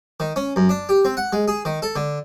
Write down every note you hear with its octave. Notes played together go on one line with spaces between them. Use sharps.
D#3
C#4
F#2
D4
G4
C4
F#5
G#3
G#4
D#3
A4
D3